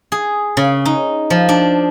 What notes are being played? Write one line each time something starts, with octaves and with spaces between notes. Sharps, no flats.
G#4
C#3
D#4
F3
D4